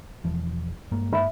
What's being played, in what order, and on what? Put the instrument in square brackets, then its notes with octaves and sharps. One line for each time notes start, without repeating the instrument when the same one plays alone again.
[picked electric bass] E1 E3 F3
G2 G#3 A#3
[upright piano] E5 B5